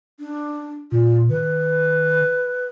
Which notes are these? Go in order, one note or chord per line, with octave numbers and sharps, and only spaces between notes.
D4
A#2 F4
D#3 B4